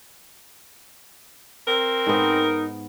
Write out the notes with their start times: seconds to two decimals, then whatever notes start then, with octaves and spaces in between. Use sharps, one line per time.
1.68 C4 A#4
2.07 G#2 B3 D#4